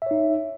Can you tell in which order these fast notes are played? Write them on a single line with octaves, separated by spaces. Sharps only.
E5 C#5 D#4